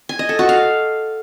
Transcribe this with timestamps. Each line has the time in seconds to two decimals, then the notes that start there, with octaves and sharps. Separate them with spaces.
0.09 G#5
0.19 D#5
0.29 A4
0.39 F#4
0.49 F5